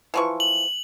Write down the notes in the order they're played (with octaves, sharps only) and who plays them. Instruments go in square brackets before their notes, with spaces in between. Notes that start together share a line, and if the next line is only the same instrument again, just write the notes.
[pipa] E3 F3 C#6
[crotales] F#7